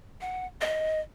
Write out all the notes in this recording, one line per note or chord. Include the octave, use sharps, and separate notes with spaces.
F#5
D#5